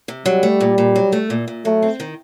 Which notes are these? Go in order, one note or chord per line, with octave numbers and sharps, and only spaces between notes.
C3
F#3 G3
A3
A#2
A#2
F#3
A3
A#2
A#2
F#3 A3
C4
D#3